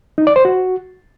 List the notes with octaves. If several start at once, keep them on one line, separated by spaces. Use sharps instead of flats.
D#4
D5
C5
F#4